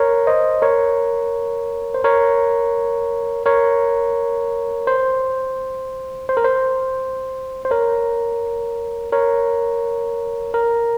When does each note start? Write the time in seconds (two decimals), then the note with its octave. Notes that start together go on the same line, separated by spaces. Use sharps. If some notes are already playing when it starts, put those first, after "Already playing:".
Already playing: A#4 C#5
0.27 C5 D#5
0.62 A#4 C#5
1.95 C5
2.04 A#4 C#5
3.46 A#4 C#5
4.87 C5
6.29 C5
6.37 A#4
6.44 C5
7.65 C5
7.71 A#4 C#5
9.12 A#4 C#5
10.54 A#4